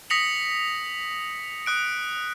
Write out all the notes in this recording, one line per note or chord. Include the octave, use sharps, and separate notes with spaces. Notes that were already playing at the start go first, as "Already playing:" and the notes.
D#6 A#6 B6 C#7 F7 F#7
D#6 F#6 D7